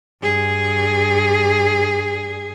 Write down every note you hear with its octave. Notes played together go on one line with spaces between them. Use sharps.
G2 G#4